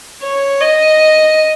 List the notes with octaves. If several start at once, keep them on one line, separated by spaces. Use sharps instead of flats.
C#5
D#5